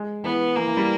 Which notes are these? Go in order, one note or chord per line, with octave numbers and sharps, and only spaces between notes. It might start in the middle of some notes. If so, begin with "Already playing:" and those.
Already playing: G#3
E3 B3
E3 A#3
E3
G3